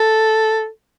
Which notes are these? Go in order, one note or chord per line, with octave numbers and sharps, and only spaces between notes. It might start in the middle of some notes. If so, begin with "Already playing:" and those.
Already playing: A4